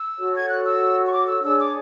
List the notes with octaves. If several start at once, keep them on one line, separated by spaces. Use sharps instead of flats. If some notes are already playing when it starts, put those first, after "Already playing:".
Already playing: E6
F#4 A4 C#5
G#6
F#6
E6
C#6
D6
E6
D4 G#4 C#5 E6
D6